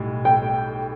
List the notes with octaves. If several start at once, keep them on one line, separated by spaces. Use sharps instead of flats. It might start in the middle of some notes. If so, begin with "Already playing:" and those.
Already playing: B1 A2 G3
G5